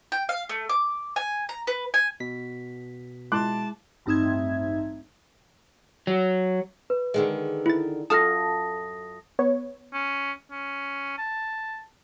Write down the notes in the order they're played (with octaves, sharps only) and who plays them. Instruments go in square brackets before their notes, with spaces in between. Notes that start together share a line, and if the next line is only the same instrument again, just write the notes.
[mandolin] G5
F5
A3
D6
G#5
A#5
B4
G#5
[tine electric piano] B2 B6
[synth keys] G#3 E4 [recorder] A5 [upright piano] C6 D6 F#6
[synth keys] A1 G2 C4 D#4 E5 G#6
[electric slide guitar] F#3
[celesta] B4
[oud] D3 D#3 G#3
[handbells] E4 A6
[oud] F#2 F4 A4 [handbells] A5 F6 [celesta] D#6 A#6
[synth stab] B3 C#5
[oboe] C#4
C#4
A5